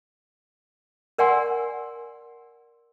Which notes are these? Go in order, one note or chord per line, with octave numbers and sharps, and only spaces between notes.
A#4 D5 F#5 G#5 C6 E6